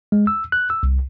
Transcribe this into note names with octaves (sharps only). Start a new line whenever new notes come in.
G#3
E6
F#6
E6
C2